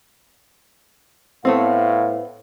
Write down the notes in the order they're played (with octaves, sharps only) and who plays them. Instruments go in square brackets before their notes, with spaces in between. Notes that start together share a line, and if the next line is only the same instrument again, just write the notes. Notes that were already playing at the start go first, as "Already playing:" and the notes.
[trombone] A2 [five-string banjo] A3 B3 C4 [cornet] F5